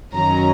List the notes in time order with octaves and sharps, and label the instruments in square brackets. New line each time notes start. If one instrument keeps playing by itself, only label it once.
[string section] F#2 D#3 F#3 C#4 A#5